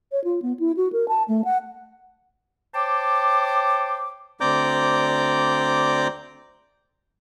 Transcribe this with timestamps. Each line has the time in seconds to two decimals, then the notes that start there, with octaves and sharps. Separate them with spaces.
0.12 C#5
0.24 F4
0.42 B3
0.59 E4
0.77 F#4
0.93 A#4
1.08 A5
1.28 A3
1.45 F#5
2.74 C5 C#5 G5 A5 D6
4.41 D2 C4 D5 A#5 D6 G6